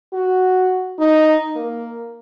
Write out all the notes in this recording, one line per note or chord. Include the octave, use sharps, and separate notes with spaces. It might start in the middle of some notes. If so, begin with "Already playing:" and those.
F#4
D#4
A#3